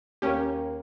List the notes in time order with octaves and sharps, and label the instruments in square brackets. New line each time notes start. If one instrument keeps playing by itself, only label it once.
[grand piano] D#2 A#3 [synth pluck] C#4 G4